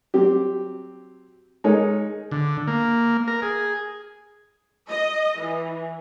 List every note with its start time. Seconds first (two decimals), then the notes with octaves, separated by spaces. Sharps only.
0.14 F#3 C4 G4
1.64 G#3 D#4 A#4 C#5
2.31 D3
2.68 A#3
3.28 A#4
3.42 G#4
4.90 D#5
5.40 E3